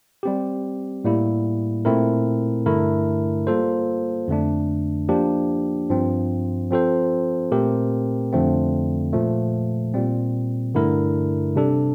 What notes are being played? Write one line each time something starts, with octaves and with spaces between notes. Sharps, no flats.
G3 C4 G4
A2 G3 A#3 E4
A#2 A3 C4 E4 A#4
G2 D3 A3 E4 A#4
G3 A#3 F4 A4 C5
F2 D3 A3 D4
F3 A#3 D4 G4
G2 F3 C4
F3 C4 F4 A4 C5
A#2 A3 C4 G4 A#4
F2 D3 F3 A3 C4
A#2 F3 A3
A#2 G3 C4
G2 D3 A3 E4 A#4
C3 G3 D4 A4